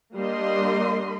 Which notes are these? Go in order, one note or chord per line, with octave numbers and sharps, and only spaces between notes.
G3 A#3 D4 A#4 D#5 C6